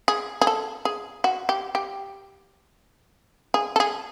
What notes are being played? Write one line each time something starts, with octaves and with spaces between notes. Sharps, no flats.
G#4
G#4
A4
G#4
F#4
G4
G4
G#4
A4
G#4